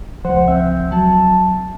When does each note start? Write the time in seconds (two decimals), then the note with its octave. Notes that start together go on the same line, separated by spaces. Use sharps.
0.25 C#2 F3 C5 F#5
0.48 C4 E5
0.92 F#3 A5